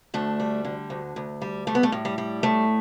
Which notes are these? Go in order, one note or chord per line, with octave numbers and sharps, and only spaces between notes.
D2 A3 D4
G3
D3
D2
D2
G3
G3 A3
B3
A3
A2
G3
G3
A2 A3